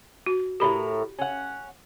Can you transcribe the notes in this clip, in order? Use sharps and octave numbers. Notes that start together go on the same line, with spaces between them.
F#4
A2 C#3 G4 A#4 B5
C#4 F#5